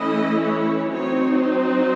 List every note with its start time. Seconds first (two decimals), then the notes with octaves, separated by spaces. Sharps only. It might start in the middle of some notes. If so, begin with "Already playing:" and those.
Already playing: E3 A3 C#4 E4 D#5
0.40 C#5
0.91 F#3 C4 D#4 C#5
1.40 C5